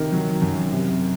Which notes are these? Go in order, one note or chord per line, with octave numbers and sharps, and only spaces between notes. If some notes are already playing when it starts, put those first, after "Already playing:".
Already playing: C3 D#3 A#4
F#3
F#2
C3